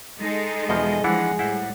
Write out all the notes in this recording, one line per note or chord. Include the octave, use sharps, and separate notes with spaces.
G#3 D#4 A4
E2 B2 F3 G#4 D#5
E3 F3 G#3 D4 E4 F#5
A2 G3 E4 C5 F#5